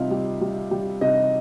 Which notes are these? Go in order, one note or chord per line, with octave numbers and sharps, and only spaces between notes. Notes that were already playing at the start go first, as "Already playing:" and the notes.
Already playing: C3 G3 D#4 F4 F5
G3
G3
G3
C3 D#4 D#5